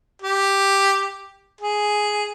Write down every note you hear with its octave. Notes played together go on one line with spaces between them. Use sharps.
G4
G#4